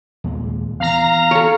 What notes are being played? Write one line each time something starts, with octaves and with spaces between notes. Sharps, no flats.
D#2 A#2 G#3
E3 B3 F5 A#5
A4 C#5